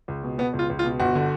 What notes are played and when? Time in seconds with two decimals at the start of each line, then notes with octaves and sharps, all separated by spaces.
0.08 C#2
0.23 B2
0.38 B2 B3
0.53 C#2
0.59 F4
0.70 C#2
0.79 F4
0.84 B2
1.00 G1 F#4
1.15 D3